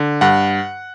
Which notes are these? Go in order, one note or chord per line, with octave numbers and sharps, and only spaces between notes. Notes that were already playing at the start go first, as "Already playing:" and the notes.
Already playing: D3
G2 F#5